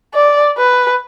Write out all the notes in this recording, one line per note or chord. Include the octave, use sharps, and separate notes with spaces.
D5
B4